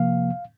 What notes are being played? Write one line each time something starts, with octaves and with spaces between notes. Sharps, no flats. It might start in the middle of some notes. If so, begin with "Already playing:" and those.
Already playing: C3 F3 A#3 F5